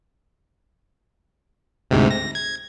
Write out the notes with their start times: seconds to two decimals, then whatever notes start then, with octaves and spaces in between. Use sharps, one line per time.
1.91 D2 G#2 C3
2.11 A#6
2.35 G#6